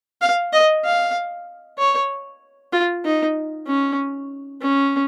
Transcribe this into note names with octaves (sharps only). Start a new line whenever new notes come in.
F5
D#5
F5
C#5
F4
D#4
C#4
C#4